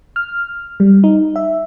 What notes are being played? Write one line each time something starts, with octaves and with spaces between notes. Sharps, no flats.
F6
G3
D#4
E5